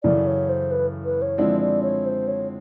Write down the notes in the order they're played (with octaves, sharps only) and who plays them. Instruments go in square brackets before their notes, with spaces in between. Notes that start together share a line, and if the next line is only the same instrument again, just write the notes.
[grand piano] F#2 C#3 E3 A3 [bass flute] D5
[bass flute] C#5
C5
B4
B4
C#5
[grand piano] D3 F3 G#3 C4 E4 [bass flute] D5
[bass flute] D5
C#5
C5
C#5